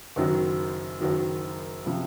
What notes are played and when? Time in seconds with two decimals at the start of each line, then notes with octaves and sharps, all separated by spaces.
0.16 F#1 F#2 D#3 F#3
1.00 F#1 F#2 D#3 F#3
1.86 C3 F3